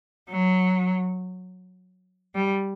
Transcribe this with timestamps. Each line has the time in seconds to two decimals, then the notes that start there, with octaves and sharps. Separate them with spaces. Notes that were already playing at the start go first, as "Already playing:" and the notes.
0.30 F#3
2.35 G3